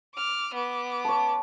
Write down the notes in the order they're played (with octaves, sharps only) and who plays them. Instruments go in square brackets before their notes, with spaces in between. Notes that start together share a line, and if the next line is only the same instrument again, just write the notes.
[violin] D6 F6
B3 D6
[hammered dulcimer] C#5 A5